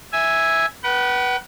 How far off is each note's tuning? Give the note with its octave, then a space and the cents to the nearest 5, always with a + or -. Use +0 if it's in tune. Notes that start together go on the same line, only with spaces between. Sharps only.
E5 -5 G#5 +0
B4 -20 F#5 +35